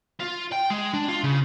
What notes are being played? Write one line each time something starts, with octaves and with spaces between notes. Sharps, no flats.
F4
G5
G#3
D4
F4
C#3